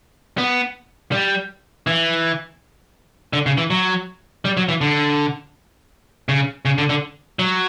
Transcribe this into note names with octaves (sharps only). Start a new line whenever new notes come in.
B3
G3
E3
D3
C#3
E3
F#3
G3
F#3
E3
D3
C#3
C#3
D3
D3
F#3